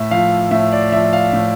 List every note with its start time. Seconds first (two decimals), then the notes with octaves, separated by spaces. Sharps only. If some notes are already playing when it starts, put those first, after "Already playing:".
Already playing: A2 E5
0.11 F3 F5
0.51 A2 E5
0.72 D5
0.92 F3 E5
1.13 F5
1.33 A2